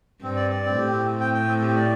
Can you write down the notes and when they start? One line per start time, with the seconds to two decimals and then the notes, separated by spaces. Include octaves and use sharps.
0.23 G2 C4
0.36 D5
0.51 D5
0.65 C4
0.78 A2 G4
0.92 C4
1.06 C4
1.21 G5
1.34 G5
1.48 C4
1.62 G4
1.76 D5